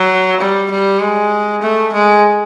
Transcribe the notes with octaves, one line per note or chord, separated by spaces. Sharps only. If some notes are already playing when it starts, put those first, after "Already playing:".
Already playing: F#3
G3
G3
G#3
A3
G#3